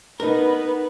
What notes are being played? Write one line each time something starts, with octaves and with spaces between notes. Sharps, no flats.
B3 D#4 A#4 B4